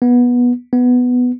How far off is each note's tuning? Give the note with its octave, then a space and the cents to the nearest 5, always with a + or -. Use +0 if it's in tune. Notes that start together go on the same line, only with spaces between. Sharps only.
B3 -15
B3 +5